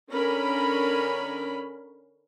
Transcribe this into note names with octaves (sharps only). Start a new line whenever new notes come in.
D3 C#4 A#4 B5